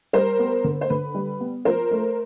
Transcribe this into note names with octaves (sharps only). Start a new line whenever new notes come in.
G3 A#4 C5
B3
D3
C5
D3 B4
G3
B3
F3 A#4 C5
A3